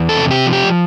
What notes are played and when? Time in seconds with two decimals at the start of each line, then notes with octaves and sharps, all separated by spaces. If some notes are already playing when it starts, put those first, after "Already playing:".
Already playing: E2
0.09 A4
0.16 C3
0.31 G4
0.46 F3
0.53 G4